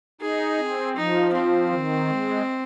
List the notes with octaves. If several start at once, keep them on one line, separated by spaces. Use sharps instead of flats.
D#4 G#4
C4
F3 D#4
C4
D#3
G#3